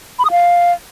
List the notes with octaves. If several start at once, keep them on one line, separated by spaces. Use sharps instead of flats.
B5
D#6
F5